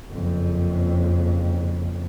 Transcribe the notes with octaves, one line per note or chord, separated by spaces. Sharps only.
F#1 F2